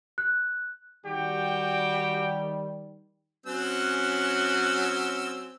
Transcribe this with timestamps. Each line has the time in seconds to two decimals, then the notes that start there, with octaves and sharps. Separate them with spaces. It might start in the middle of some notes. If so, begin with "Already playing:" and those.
0.18 F#6
1.05 D#3 G3 F#4 G4 G5
3.46 F#3 C4 C#4 E6 F#6